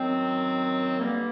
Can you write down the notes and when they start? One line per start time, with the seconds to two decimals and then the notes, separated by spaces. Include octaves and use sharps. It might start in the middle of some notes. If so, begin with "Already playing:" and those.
Already playing: F#2 D#3 F#3 C4
0.98 G2 D3 G3 A#3